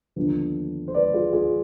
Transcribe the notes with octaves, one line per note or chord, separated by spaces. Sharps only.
D#2 D3 F3 B3 D4
C5
B4 D5
F4 G#4
F4 G#4